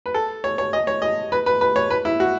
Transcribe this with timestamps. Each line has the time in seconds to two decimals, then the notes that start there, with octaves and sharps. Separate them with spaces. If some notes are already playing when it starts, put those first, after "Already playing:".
0.06 B4
0.14 A4
0.44 C#5
0.58 C#5
0.73 D#5
0.87 C#5
1.02 D#5
1.32 B4
1.46 B4
1.61 B4
1.76 C#5
1.91 B4
2.05 E4
2.20 F#4